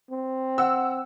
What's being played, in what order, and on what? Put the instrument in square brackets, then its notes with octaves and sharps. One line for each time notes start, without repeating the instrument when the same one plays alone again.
[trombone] C4
[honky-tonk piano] F#5 E6